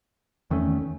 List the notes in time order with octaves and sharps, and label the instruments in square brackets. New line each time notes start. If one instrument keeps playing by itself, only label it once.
[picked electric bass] E2 D#3 A3 C#4